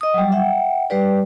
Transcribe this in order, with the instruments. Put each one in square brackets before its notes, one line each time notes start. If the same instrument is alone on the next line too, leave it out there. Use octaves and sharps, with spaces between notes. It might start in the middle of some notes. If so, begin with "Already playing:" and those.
[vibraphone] D#5 D#6
F#3 G3
E5 F#5 G5
G3 G4 B4 D5